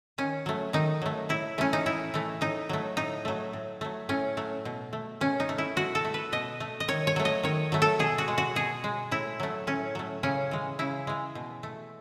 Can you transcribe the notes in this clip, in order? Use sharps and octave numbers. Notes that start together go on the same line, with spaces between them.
D#3 C#4
F#3 A3
D#3 D#4
F#3 A3
A2 E4
E3 A3 C#4
D#4
A2 E4
E3 A3
A2 D#4
F#3 A3
A2 D#4
F#3 A3
A2
F#3 A3
A2 C#4
F#3 A3
B2
A3
B2 C#4
D#4
A3
E4
B2 F#4
A4
A3
B4
B2 D#5
A3
D#5
D#3 C#5
C#5
F#3 A3
D#5
D#3 C#5
F#3 A3
A4
B2 G#4
F#4
G#3
F#4
B2 G#4
G#3
A2 E4
F#3 A3
A2 C#4
F#3 A3
C#3 C#4
E3 G#3
C#3 E4
E3 G#3
B2
A3